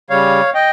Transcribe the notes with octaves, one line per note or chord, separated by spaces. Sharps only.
C#3 G3 C#5 F5
D#5 G5